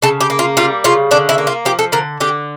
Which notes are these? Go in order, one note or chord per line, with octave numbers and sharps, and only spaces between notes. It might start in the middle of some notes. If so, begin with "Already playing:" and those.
C#3 A4
G4
A#3
F4
G3 F4
C#3 F4
D3 D4
E4
A#3
F4
F3 G4
A4
D3 A#4
D3 G4